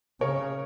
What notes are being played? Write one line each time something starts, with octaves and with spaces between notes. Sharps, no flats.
C#3 A#4 C#5